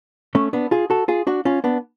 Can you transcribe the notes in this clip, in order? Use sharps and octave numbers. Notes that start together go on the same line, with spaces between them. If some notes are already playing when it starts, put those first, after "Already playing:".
A3 C#4
B3 D4
F4 G#4
F#4 A4
F4 G#4
D4 F#4
C#4 F4
B3 D4